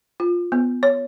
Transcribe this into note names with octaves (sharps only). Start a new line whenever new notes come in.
F4
B3
C#5